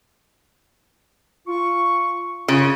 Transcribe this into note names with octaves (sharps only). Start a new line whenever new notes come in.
F4 C#6
F#2 C#3 F4